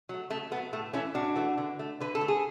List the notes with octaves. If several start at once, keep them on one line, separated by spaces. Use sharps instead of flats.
F#3 A3
C#3 A3
F#3 A3 B3
A2 A3
E3 A3 C#4 E4
A2 D4 F#4
E3 A3
D3
A3
D3 B4
A4
A3
G#4